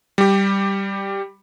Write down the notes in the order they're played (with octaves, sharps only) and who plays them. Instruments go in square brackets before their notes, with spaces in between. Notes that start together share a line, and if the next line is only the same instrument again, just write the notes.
[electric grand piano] G3 G4